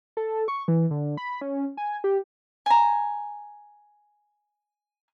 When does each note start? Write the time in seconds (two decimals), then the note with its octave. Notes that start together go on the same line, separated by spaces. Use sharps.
0.17 A4
0.48 C#6
0.68 E3
0.91 D3
1.17 B5
1.41 C#4
1.77 G#5
2.04 G4
2.66 G#5 A#5